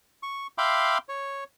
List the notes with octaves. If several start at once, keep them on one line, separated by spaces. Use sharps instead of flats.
C#6
E5 F5 G5 B5 C6 D6
C#5